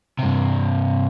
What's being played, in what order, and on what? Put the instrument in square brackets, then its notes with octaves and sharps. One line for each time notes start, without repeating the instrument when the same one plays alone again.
[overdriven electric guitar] G2 C3